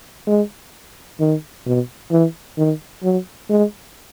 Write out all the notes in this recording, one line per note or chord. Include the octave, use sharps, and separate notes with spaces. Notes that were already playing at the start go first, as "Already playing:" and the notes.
G#3
D#3
B2
E3
D#3
F#3
G#3